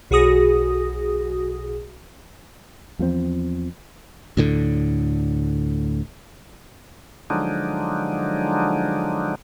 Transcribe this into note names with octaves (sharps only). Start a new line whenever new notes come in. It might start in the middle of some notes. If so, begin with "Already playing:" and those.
B1 F#4 G#4 D#6 A#6
E2 F3 G#3 C4
D2 A2 D3
D3 F3 F#3 G#3 D4 D#4